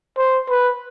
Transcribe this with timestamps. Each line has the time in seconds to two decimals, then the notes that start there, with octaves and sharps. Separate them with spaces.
0.17 C5
0.50 B4